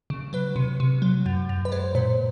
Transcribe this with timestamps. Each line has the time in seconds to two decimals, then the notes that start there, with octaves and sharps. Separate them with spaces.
0.10 C#3
0.33 F#3 B4
0.56 C3
0.80 C3
1.02 F#3
1.26 F#2
1.49 F#2
1.65 B4
1.72 G#3 C5
1.95 A#2 C5